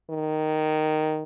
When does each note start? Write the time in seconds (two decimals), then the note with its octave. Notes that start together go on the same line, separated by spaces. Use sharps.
0.10 D#3